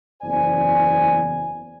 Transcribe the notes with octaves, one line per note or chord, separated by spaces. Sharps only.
F#1 E2 C5 D5 G#5